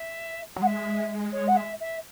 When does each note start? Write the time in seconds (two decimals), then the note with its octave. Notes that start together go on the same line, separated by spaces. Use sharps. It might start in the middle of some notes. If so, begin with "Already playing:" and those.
Already playing: E5
0.56 F#3
0.62 G#3 F#5
0.67 E5
1.33 C#5
1.48 F#5
1.57 E5
1.81 E5